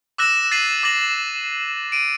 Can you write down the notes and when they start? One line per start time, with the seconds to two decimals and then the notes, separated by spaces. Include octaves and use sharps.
0.18 D6 E6 F#6 A#6 E7
0.52 A6 C7 D#7 F#7
0.83 D6 A6 A#6 F#7
1.92 D7 D#7